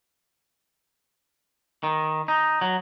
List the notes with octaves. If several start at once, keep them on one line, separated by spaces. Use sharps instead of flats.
D#3
D#4
F#3